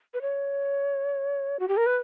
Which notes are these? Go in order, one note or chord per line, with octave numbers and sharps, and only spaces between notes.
B4
C#5
F#4
G4
A#4
B4